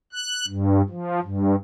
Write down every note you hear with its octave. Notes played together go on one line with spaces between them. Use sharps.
F#6
G2
F3
G2